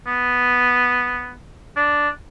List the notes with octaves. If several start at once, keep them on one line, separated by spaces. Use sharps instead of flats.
B3
D4